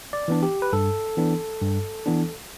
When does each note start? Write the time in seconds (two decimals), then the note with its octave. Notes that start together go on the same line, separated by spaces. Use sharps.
0.13 D5
0.28 E3 B3 D4
0.43 G4
0.62 B4
0.73 G2 A4
1.17 E3 B3 D4
1.61 G2
2.06 E3 B3 D4